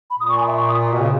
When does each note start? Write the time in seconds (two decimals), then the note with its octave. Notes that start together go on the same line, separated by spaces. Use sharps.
0.10 B5
0.19 A#2 D#6
0.29 C#6
0.38 G#5
0.47 E5
0.57 C#6
0.68 D#6
0.93 B2
1.01 C#3